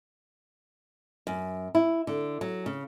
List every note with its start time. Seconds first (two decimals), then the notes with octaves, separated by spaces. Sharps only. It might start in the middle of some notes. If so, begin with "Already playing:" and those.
1.27 F#2
1.75 E4
2.07 D3
2.41 F#3
2.66 C#3